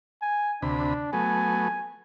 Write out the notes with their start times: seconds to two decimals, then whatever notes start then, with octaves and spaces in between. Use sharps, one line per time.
0.22 G#5
0.62 D2 C3 D4 B5
1.13 F#3 A3 B3 G#5